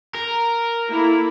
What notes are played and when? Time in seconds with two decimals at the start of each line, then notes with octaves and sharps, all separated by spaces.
0.15 A#4
0.89 A#3 E4 A4